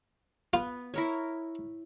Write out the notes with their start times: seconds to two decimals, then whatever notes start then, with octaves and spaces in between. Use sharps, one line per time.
0.53 B3 F4
0.94 E4 A#4 C#5